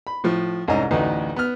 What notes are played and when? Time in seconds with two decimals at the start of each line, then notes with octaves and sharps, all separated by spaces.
0.07 B5
0.24 A2 F3
0.68 C2 G#2 C#4 D#5
0.91 A1 D2 A2 D#4 B4
1.36 B3 F6